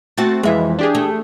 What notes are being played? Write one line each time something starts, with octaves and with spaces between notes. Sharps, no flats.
A3 C4 F#4 A6
F2 E3 G#3 E5
D4 G4 G#4
A3